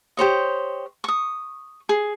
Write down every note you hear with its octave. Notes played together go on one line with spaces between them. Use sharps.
G4 C5 C#5 D#5
C#6 D#6
G#4